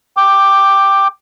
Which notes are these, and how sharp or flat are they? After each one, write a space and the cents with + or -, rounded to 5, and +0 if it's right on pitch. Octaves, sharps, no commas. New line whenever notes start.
G5 +0 D6 +10